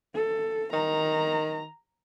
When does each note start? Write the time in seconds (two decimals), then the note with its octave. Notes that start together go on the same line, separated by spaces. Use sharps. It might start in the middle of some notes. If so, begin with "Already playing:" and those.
0.14 A4
0.73 D#3 A#5